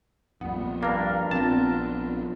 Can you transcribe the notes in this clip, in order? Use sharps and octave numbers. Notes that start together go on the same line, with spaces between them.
A#1 F2 A#2 G3 B3
G2 A#3 D4 A#4
A#1 B3 C4 F4 A5